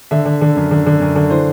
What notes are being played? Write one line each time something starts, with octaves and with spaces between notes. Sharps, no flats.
D3 E5
D3
D3
F#2
D3
D3
F#2
D3
E3 C5